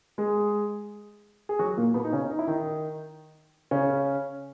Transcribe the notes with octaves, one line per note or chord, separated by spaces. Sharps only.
G#3 G#4
G#4
F#3 F#4
A#2 A#3
B2 B3
D#4
C#3 C#4
D#4
E4
D#3 D#4
C#3 C#4